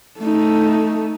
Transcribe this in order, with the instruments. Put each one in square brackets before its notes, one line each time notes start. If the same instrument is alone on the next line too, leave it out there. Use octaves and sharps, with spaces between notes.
[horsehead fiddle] A3 D#4